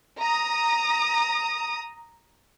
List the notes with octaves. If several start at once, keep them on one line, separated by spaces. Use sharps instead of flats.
A#5 D#6